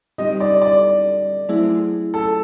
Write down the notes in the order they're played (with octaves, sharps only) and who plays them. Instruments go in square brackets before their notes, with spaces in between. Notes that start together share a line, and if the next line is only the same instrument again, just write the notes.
[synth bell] G3 C4 D#4 G4 [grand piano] D#5
[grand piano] D5
D5
[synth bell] F#3 A3 C4 E4 G#4
[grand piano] A4